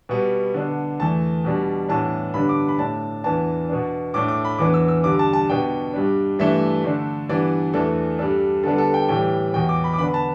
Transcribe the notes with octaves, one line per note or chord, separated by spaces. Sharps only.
B2 G3 B3
D3 B3 D4
E2 E3 A3 A5
B2 G3 D4
A2 E3 B3 D4 A5
G2 D3 B3 D4 B5
D6
B5
A2 A3 D4 A5
E2 E3 B3 D4 A5
B2 B3 D4
A2 A3 D4 D6
D6
B5
E2 E3 B3 D4 D6
E6
E6
G2 D3 G3 D4 D6
A5
A5
B2 B3 D4 G5
G2 G3 D4
G2 E3 A3 D4 E5
D3 A3 D4
G2 E3 B3 D4 D5
E2 E3 A3 D4 A4
G2 G3 D4 A4
D3 G3 B3 D4 A4
A4
G5
A2 E3 G3 G5
E2 B2 B3 G5
D6
B5
D6
D3 B3 D4 B5
B5
A5